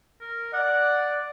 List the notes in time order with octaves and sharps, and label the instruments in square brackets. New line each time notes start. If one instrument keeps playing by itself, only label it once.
[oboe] A#4
[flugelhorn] D5 [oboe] F#5